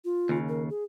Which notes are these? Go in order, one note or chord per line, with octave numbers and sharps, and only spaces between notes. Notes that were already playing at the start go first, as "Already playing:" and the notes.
F4
D#2 C#3
A#4
G#4